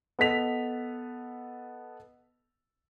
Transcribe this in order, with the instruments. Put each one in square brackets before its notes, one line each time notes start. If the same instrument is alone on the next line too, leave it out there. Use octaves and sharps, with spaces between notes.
[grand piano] B3 A4 D#5 B6 F7